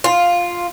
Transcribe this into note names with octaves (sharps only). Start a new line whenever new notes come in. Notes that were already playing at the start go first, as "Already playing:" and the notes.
F4